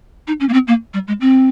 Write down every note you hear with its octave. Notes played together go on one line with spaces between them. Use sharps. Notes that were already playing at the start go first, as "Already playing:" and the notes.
D#4
C#4
A#3
C4
A#3
G3
G#3
C4